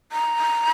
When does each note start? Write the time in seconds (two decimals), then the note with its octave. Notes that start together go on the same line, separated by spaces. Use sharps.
0.12 A#5